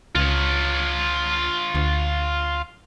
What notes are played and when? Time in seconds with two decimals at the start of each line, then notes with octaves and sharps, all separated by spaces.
0.15 C#2 F4 C#5
1.75 D2